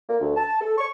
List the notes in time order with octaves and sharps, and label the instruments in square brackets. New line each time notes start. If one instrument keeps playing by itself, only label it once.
[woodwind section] A#3
D2
A5
A4
C#6